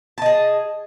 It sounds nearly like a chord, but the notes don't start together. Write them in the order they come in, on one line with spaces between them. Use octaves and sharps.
A5 D#5 G#4